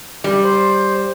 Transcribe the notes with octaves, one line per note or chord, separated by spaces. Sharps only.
G3
C5